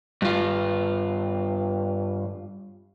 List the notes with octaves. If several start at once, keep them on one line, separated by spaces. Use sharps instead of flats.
G2 F4